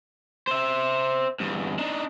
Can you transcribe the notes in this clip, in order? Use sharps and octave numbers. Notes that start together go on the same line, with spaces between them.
C5 E5
E2 G2
D4 D#4